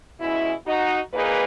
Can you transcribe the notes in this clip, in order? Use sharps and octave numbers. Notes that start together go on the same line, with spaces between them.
B2 G#3 C#4 E4
D#4 F#4
A#2 A#3 D#4 G#4 B4